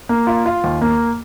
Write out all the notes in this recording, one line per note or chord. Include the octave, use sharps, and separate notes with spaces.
A#3
F4
F4
D#2
A#3